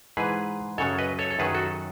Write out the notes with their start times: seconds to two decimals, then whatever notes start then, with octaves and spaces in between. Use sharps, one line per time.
0.17 G#2 E3 G#4 B4
0.78 F#2 C#3 F#3 A4 C#5
0.99 B4 D#5
1.19 A4 C#5
1.31 A4
1.39 F#2 D#3 F#3 G#4 B4
1.54 F#4 A4